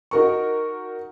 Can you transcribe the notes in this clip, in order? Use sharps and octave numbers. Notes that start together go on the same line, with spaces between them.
D#4 F#4 A#4 C#6